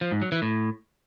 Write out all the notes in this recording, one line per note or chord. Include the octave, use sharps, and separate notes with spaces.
F3
G#2
F#3
E3
A2